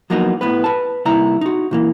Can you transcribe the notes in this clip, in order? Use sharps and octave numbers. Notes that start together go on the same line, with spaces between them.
F3 F#3 A#3 B3 D#4 F#4
A2 B3 B4
B4 A5
C2 A#2 D#3 E4 A#5
D#4 F#4
A#2 E3 A#3